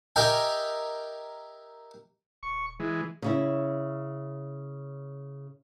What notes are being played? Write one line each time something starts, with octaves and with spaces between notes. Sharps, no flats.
G4 A#4 D#5 E5 G5 G#5
D#1 C#6
E3 G#3
C#3 C#4 E4